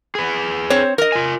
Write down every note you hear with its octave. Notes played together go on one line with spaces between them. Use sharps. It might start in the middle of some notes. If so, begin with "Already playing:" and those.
G#4 B4
C4 C5 C#5
A#4 D#5
F4 G#5